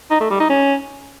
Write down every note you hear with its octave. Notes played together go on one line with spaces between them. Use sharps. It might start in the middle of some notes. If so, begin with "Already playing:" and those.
D#4
A3
G3
D#4
C#4